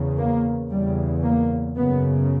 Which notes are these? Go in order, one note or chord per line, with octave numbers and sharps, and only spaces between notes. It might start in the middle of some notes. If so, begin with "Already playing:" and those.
Already playing: E2 C#3
A#3
E2 C#3 G3
A#3
F#2 C#3 B3